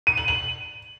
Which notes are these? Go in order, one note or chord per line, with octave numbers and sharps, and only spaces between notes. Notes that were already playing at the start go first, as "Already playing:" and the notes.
D#7
F#7
F#7